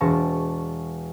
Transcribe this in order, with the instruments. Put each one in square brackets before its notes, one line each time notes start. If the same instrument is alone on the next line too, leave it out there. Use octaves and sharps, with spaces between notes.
[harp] E1 A5 A#5 C#6